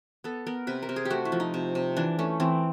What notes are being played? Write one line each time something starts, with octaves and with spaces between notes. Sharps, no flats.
B3 A4
B3 A#4
C3 B4
A#4
C3
G#4
G4
A3 F#4
E4
F3
D#4
C3
C3
E3 D4
A3 C#4
E3 C4